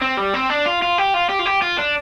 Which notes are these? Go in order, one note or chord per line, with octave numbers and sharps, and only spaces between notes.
C4
G3
C4
D4
F4
F4
G4
F4
G4
F4
G4
F4
D4